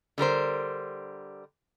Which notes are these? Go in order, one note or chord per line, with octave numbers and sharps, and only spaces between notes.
D3 G3 A#4 C5